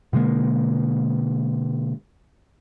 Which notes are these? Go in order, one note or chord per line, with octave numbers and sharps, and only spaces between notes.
B2 D3 G#3 A#3